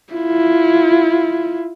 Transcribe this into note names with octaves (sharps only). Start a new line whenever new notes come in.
E4 F4